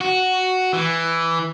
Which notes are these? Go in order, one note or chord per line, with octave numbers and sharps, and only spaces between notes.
F#4
E3